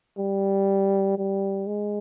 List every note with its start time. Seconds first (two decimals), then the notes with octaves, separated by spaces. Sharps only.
0.18 G3
1.18 G3
1.67 G#3